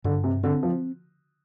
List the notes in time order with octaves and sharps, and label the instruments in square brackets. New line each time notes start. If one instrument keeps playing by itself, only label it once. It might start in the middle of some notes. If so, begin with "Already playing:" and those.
[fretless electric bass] G2 [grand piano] D3
[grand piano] C3
[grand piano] D3 [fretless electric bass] C4
[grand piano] F3